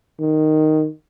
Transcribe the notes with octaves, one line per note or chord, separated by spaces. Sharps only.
D#3